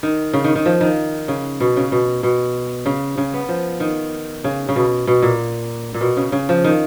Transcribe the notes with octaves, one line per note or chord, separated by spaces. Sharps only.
D#3
C#3
D#3
D#3
F3
D#3
C#3
B2
C#3
B2
B2
C#3
C#3
B3
F3
D#3
C#3
C#3
B2
B2
A#2
A#2
B2
C#3
C#3
F3
D#3